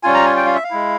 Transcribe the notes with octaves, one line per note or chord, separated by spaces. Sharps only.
G3 C#4 F4 G#5
A#5
G#5
G5
F5
E5
F5
G#3 E4